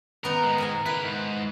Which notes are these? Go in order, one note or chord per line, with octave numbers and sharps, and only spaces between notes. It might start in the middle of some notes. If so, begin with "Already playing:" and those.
D#3 B3 D#4 A#4
G#2 G#3
A#4 D#5 G#5
E4 A#4 B4
G#2